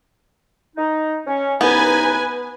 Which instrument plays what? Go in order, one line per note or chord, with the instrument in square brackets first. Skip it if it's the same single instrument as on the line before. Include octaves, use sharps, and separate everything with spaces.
[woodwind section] D#4
C#4
[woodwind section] C2 F#2 D#4 [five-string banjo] B3 [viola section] B4 G#5